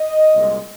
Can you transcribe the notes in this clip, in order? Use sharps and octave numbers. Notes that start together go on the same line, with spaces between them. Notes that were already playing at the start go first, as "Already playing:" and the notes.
Already playing: D#5
C2 A#2 G#3